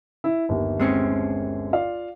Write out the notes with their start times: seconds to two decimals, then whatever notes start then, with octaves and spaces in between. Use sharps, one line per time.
0.24 E4
0.49 G1 D#2
0.80 G#3 C4 C#4
1.73 F4 D5 F5